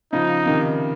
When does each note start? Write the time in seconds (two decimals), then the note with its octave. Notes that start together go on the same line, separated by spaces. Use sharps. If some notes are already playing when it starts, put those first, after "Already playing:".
0.12 C#3 F3 D#4
0.46 C3 D#3